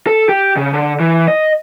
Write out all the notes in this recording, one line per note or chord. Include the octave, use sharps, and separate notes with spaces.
A4
G4
C#3
D3
E3
D#5